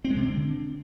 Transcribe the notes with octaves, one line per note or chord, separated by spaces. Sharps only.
C4
G#3
C3
C4
D3